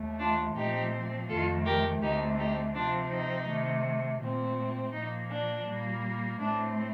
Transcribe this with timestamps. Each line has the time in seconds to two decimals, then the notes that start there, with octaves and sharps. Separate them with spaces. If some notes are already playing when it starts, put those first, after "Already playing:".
Already playing: D#2 D#3 A3
0.19 D4 F4
0.55 A#2 F3 A3 C4 D#4 G4
1.28 F2 D#3 A3 F4 A4
1.65 G4 A#4
2.01 D2 D3 A3 C4 D#4 G4
2.38 D#4 G4
2.74 C3 F3 C4 D4 F4
3.11 D#4
3.48 C3 D#3 A3
4.21 A#2 A3 C4
4.93 A#2 F3 A#3 D#4
5.30 D4
5.67 A#2 G3 A#3
6.39 A2 A3 C4 D4